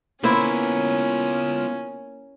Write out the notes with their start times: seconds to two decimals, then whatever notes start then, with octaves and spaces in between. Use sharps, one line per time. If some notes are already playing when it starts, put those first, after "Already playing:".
0.24 A#3 B3 C#4 E4 F4 C5 C#5